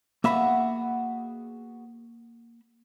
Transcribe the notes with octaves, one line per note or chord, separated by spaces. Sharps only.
A#3 B3 F#4 G#4 E5 B5